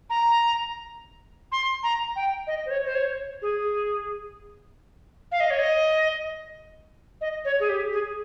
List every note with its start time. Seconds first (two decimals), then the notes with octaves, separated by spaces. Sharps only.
0.10 A#5
1.52 C6
1.83 A#5
2.16 G5
2.47 D#5
2.66 C5
2.71 C#5
2.85 C5
2.95 C#5
3.42 G#4
5.32 F5
5.40 D#5
5.50 C#5
5.59 D#5
7.21 D#5
7.45 C#5
7.60 G#4
7.69 G4
7.93 G#4